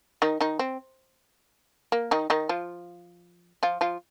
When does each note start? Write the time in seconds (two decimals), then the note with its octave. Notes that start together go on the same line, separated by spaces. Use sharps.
0.22 D#3 D#4
0.40 D#3 D#4
0.59 C4
1.92 A#3
2.11 D#3 D#4
2.30 D#3 D#4
2.49 F3 F4
3.63 F3 F4
3.81 F3 F4